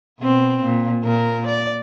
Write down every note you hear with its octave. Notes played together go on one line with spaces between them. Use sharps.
B2 C4
A#2
A#2 A#4
D5